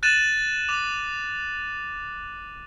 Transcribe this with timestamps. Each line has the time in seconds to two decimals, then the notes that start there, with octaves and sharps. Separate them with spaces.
0.03 F#6 A6 D#7 E7 F#7
0.69 D6 E7